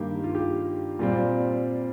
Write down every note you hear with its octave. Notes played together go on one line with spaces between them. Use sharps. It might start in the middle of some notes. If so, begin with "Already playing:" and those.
Already playing: G2 D#3 A#3 G4
F4
G4
A#2 G3 C4 F4